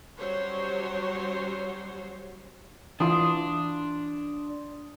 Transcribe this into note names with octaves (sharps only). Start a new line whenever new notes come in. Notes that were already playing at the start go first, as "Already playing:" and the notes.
F#3 G3 C#4 C5 C#5
E3 D4 E4 F4 C6 D#6